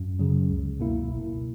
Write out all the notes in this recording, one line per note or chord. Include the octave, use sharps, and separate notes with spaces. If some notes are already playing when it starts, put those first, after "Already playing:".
Already playing: F#2
C#3 F#3
C#2
B2 A#3 E4
G#1